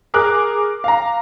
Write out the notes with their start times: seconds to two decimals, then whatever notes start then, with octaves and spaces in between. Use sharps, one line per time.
0.14 G#4 A#4 D6 F#6
0.84 F5 A#5